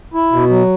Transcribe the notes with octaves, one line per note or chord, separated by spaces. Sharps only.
E4
B2
F#3